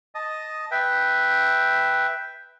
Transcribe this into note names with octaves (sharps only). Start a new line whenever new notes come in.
D#5 A5 D#6
B4 E5 G5